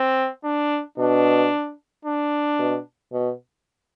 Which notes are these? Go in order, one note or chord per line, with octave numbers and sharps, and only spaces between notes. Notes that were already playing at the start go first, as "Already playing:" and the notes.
Already playing: C4
D4
B2 D4
D4
B2
B2